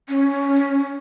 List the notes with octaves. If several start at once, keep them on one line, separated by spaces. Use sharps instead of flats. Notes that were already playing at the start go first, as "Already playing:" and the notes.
C#4